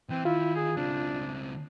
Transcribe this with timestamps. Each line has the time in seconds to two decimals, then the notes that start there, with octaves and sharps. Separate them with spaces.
0.10 E3 C4
0.25 D#3 E4 F4
0.56 G#4
0.77 C#2 C4 D4